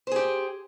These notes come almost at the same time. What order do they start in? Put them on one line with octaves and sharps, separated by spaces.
C5 G#4 G4